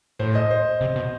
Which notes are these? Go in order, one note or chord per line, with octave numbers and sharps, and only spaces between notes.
A2 C5
D#5
C5
C3
B2